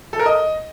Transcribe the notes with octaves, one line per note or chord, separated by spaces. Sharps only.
A4
A#4
D#5